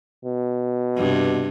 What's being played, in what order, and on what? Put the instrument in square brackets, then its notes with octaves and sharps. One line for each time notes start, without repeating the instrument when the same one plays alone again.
[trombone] B2
[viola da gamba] G2 C3